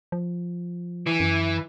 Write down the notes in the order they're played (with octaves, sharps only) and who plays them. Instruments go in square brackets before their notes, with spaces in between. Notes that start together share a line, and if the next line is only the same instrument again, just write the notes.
[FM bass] F3
[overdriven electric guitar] E3
[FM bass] F#2